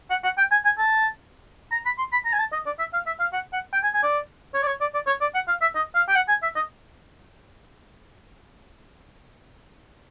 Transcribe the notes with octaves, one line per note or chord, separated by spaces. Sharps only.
F#5
F#5
G5
G#5
G#5
A5
A#5
B5
C6
B5
A#5
G#5
A5
D#5
D5
E5
F5
E5
F5
F#5
F#5
G5
G#5
G#5
D5
C#5
D5
C#5
D5
D5
C#5
D5
F#5
F5
E5
D#5
F5
G5
F#5
G#5
E5
D#5